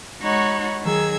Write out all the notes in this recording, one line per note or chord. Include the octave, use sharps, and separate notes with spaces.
G#3 D#4 F#4 C#5 F#5 B5
D#3 F#3 G#4 E6 G#6